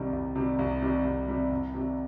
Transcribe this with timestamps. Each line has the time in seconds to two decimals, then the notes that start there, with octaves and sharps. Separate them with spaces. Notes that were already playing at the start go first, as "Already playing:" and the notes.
Already playing: C2 C3 D#3 G3
0.13 C2
0.36 C3 D#3 G3
0.59 C2
0.82 C3 D#3 G3
1.05 C2
1.28 C3 D#3 G3
1.51 C2
1.74 C3 D#3 G3